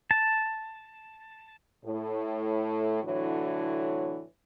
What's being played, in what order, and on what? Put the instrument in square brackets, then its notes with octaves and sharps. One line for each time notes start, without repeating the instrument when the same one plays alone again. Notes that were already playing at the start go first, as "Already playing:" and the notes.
[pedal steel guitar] A5
[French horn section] A2
A2 D3 E3 F#3 C#5